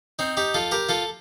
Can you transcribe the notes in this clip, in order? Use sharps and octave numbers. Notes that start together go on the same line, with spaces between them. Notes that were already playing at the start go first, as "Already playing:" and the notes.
C4 D#4
D#4 G4
F4 A4
G4 A#4
F4 A4